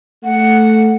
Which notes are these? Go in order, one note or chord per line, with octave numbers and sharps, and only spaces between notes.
A3 F#5